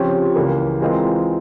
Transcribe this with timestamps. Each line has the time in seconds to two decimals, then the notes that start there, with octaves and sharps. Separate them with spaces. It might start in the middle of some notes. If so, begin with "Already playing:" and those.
Already playing: C#3 F3 C4 G4 C#5
0.36 C#2 C#3 E3 A#3
0.80 E3 G#3 C4 F4 A#4